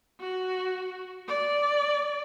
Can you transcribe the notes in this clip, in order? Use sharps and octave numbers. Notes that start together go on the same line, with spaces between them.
F#4
D5